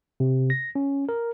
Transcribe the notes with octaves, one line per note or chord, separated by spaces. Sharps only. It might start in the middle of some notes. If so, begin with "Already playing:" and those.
C3
A#6
C#4
A#4